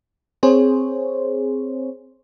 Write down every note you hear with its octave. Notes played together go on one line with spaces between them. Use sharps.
C4 G#4 C5 C#5